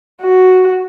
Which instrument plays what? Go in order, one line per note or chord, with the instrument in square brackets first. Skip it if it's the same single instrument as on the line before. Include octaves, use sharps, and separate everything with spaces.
[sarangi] F#4